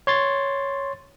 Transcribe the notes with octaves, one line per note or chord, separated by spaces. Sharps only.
C#5 C6 A6